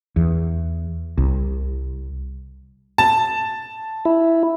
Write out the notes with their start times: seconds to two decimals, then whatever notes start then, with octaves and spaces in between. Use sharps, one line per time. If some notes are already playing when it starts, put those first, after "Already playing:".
0.16 E2
1.18 C2
2.98 A5
4.05 E4